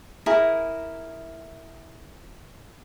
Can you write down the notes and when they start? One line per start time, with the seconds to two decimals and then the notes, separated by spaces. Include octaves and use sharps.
0.26 E4 G#4 A#4